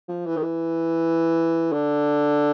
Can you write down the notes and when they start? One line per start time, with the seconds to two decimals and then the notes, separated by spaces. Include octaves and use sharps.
0.09 F3
0.26 E3
0.37 D#3
0.43 E3
1.72 D3